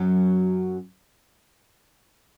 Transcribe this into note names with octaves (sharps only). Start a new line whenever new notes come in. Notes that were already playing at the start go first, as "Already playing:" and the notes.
Already playing: F#2 F#3